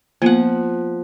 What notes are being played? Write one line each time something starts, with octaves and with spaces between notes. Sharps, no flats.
F3 A#3 B3 F#5